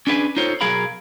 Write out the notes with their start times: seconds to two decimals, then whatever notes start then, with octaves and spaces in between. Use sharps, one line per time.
0.07 C#4 D4 G#4 B4 E5 G#5
0.37 D#4 F4 A4 C5 C#5
0.61 B1 F#3 G#4 A#4 F5 B5